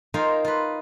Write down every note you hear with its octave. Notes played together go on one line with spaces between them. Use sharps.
D#4 F4 A#4 C5 F5 G#5
F4 B4